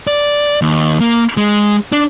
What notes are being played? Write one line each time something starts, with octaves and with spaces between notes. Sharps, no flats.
D5
D#2
A#3
G#3
D4